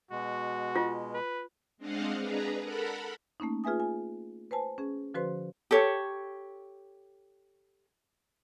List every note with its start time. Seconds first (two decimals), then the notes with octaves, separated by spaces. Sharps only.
0.11 B2 G#3 F#4
0.76 F4
1.14 B4
1.78 G#3 C4 D4 D#5 F5 F#5
2.17 D4 G#4 B4 A#5
2.61 A4 A#4 F#5 B5
3.40 A3 A#3 C#4 D#4
3.64 F4 G#4 B4 E5 G#5 D#6
3.80 G#5
4.51 B4 C5 G#5 A5
4.78 C#4 G#4
5.14 D3 F3 F#4 B4 C5 C6
5.71 G4 A4 C#5